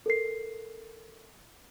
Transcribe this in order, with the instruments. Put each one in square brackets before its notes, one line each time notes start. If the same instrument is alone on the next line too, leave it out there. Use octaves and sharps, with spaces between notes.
[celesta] A4 A#4 C7